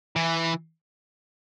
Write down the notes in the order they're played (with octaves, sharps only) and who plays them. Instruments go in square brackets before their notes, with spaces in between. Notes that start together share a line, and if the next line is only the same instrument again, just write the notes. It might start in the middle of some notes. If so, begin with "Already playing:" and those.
[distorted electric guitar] E3